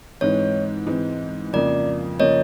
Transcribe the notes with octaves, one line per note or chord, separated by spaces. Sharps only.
G#2 E3 G#3 C4 C#5
G#2 E3 G#3 C4
F2 C#3 F3 A#3 D5
C#3 F3 A#3 C#5 D#5